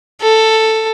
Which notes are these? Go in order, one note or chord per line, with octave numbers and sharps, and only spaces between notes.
A4